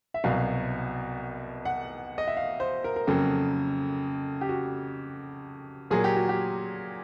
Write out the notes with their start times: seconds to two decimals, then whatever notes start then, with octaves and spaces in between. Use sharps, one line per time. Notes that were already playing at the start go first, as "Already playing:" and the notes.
0.14 E5
0.24 C2 B2 F#3 F5
1.65 F#5
2.18 D#5
2.28 E5
2.37 F5
2.60 C5
2.84 A#4
2.96 A#4
3.07 F2 C#3 F#3 A#3 A4
4.41 G4
4.49 F#4
5.91 A#2 F#3 A#3 G#4
6.04 G4
6.16 F#4
6.29 G4